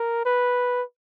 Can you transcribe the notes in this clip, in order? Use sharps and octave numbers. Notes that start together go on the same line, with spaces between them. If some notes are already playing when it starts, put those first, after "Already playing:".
Already playing: A#4
B4